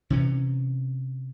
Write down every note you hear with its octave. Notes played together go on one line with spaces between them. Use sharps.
C3 E3 C#4